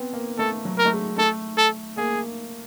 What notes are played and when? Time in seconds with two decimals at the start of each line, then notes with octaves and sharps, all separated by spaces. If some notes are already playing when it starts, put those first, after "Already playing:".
Already playing: B3 C4
0.13 A#3
0.39 A3 A4
0.65 F#3
0.78 A#4
0.85 A3
0.92 G#3
1.18 A3 A4
1.57 A4
1.97 A#3 G#4